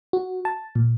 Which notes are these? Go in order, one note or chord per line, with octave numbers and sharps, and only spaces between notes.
F#4
A5
A#2